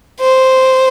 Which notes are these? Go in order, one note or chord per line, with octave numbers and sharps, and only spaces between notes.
C5